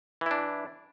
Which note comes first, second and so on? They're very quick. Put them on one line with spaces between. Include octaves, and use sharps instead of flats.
E3 E4 D4